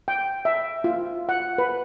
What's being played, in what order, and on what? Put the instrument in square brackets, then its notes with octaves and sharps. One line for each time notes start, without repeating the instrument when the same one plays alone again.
[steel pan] G5
E5
F4
F#5
B4